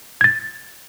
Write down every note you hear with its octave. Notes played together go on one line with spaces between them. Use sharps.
G#6 A6